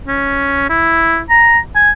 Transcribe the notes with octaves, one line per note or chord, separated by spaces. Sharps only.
C#4
E4
A#5
G#5